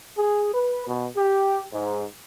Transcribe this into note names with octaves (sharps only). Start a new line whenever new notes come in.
G#4
B4
B2
G4
G#2